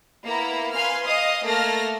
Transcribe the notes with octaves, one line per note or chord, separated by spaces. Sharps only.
A#3 B3 E4 A#5
B4 F5 G#5 C6 F6
D#5 F5 D#6
A3 A#3 A5 F6 A#6